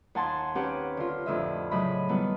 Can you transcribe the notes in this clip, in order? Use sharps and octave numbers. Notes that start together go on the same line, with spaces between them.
D#2 F#5 G#5 A5 C6
C4 C#4 G4 A#4 B4 F#5
D3 F4
F2 A2 D3 D#5 E5
A2 C#3 F#3 D#5 B5
D#3 G3 A3 B3 E4